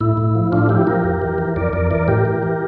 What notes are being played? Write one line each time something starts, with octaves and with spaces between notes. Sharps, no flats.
A2 E4
A2
F3
A2 D4 F4
F3 E4 G4
F3 G4 A#4
F2
E3
E3
F2 A#4 D5
F2 A#4 D5
E3 A#4 D5
A2 G4 A#4
E3
E3